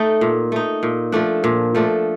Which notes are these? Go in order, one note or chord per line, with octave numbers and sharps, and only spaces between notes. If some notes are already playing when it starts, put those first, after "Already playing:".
Already playing: A3 D#4
A#2
A3 D#4
A#2
F3 A3 D4
A#2
F3 A3 D4